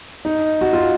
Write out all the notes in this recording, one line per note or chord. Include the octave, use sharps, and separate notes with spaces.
D#4
F#4
F4